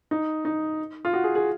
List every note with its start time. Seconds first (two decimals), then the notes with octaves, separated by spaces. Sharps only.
0.11 D#4
0.45 D#4
1.05 F4
1.13 F#4
1.24 G#4
1.35 G#4